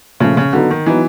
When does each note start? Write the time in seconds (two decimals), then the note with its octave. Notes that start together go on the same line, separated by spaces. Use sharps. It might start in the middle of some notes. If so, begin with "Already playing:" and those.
0.20 A#2 C#3 F3 A3
0.37 C#3
0.53 D3 F#3 B3 D#4
0.71 D#3
0.86 E3 F#3 B3 D#4